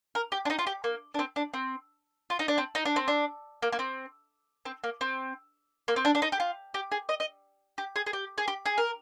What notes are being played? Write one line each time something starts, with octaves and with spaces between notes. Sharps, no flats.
A#4
G4
D4
D#4
F4
G4
A#3
D4
C4
D4
C4
F4
D#4
D4
C4
D#4
D4
C4
D4
A#3
A#3
C4
C4
A#3
C4
A#3
C4
D4
D4
D#4
G4
F4
G4
G#4
D#5
D#5
G4
G#4
G#4
G4
G#4
G4
G#4
A#4